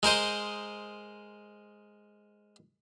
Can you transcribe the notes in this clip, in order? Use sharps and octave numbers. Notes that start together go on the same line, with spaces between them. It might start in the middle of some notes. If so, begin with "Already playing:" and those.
G#3 A#4 C5 D#5